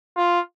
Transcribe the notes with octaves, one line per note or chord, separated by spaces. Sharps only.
F4